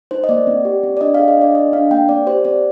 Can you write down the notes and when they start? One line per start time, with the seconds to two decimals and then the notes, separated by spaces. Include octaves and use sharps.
0.11 D#4 C5
0.24 D#5
0.29 A#3 D5
0.47 C4
0.65 G4
0.83 C4
0.97 D5
1.01 D4 D#5
1.15 G#4 F5
1.28 D#5
1.37 D4 D5
1.55 G#4 D#5
1.73 D4 F5
1.91 A#3 G5
2.09 C4 D5
2.27 G4 C5
2.45 C4 D5